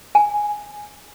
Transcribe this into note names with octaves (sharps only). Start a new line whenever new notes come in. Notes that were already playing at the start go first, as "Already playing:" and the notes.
G#5